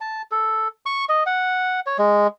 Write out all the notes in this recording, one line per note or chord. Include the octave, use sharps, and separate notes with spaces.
A5
A4
C#6
D#5
F#5
C#5
G#3